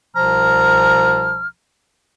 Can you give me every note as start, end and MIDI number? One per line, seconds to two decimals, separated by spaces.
0.16 1.47 36
0.16 1.47 47
0.16 1.47 53
0.16 1.47 82
0.16 1.47 89